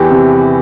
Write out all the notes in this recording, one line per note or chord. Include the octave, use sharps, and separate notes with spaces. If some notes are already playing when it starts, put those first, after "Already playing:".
Already playing: E2 E3 G4
C3